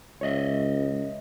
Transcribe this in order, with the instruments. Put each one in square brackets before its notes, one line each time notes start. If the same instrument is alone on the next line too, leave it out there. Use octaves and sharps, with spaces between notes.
[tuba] C#2 [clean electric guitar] C#5 D#5 E5